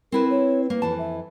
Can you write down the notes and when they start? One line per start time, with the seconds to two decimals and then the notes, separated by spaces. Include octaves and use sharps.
0.12 C4 E4 A#4 B4
0.30 C#5
0.70 A#3 B4
0.82 F2 E3 A5
0.99 E5